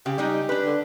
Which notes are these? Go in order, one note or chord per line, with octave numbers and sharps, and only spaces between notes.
C#3 G4
G3 G#3 D#4
D4 B4
D3